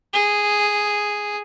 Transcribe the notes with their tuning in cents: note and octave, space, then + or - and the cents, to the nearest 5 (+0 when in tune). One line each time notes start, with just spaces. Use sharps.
G#4 -5